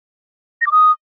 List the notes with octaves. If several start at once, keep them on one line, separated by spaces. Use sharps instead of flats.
A#6
D6
D#6